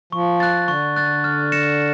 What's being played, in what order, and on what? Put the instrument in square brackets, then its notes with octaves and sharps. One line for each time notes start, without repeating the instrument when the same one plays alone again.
[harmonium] F3 [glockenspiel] C#6
[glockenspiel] F#6 A6
[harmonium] D3 [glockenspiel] C#6
[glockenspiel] F#6 A6
F6
A#6 C#7 E7